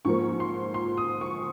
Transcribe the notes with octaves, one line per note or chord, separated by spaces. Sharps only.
G#2 F3 A#3 C#6
C6
C6
D#6
C#6